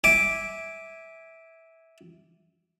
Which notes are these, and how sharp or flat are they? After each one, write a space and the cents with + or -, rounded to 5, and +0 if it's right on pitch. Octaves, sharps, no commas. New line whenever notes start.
E5 -15 G#5 -10 D6 +0